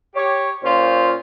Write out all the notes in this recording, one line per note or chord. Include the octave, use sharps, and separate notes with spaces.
G4 C#5
A#2 C#4 F4 C5